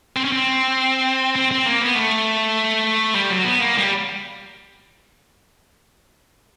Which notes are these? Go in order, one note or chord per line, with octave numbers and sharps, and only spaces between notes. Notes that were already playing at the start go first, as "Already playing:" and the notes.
C4
C#4
C4
C4
C4
A#3
B3
A3
G3
F#3
B3
A#3
G3